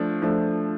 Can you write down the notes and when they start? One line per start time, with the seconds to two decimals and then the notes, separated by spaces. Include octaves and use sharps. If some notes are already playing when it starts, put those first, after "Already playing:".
Already playing: F3 A3 D4
0.22 F3 A3 D4